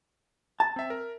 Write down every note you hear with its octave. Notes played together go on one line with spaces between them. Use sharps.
A5
C4 E5
A#4